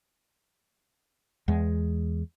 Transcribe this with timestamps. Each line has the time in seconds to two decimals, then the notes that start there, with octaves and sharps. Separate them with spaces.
1.48 E2 G#3